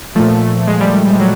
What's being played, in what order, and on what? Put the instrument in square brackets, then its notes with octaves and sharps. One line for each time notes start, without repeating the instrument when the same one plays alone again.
[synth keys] A#2 F3 A3
G#3
G3
G3
G3
F#3